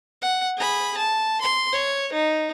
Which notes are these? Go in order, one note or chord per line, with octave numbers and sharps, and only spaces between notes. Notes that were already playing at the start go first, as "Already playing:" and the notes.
F#5
G#4 B5
A5
C6
C#5
D#4